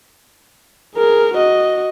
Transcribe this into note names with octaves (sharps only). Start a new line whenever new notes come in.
G#4 A#4
F#4 D#5